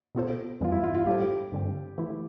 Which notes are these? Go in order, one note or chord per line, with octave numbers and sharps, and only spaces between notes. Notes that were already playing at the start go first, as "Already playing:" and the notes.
B2 B3 F4 A4 C5
F2 E3 G3 B3 F4
E4
F4
F4
A2 G3 D4 G4 A4 C5
G2 D3 G3 C4
E3 A3 E4